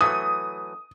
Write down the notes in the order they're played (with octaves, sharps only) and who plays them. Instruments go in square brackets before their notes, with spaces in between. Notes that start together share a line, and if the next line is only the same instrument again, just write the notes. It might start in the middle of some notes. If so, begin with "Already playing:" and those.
[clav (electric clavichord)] E3 F#3 A3 [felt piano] D#6